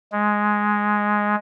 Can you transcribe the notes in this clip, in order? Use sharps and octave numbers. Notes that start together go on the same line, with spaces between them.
G#3